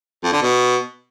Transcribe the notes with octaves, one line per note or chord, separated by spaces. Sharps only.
F2
D3
B2